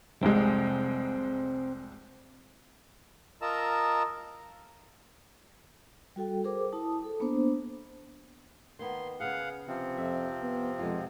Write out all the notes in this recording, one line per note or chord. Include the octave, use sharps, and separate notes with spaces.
F1 C2 G#3 C4
F4 A#4 D#5 A5 A#5 E6
G3 F#4 A4 G5
G#4 A#4 C5 D6
E4 A5 D#6
A4
A#3 B3 D4 C5
D#3 A#3 B3 C6
C#3 B3 G#4 F5 F#5
C3 F3 C4
F2 E5
B3
F2 B2 G#3 F4